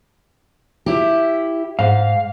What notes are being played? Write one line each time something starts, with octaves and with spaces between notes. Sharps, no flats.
E4 G4
G#2 F5